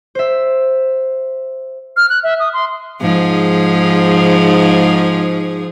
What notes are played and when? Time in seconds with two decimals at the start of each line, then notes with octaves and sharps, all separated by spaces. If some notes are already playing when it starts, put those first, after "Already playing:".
0.15 C5 E5
1.97 F6
2.10 F#6
2.24 E5
2.40 D#6
2.54 C6
3.01 G#2 F3 G#4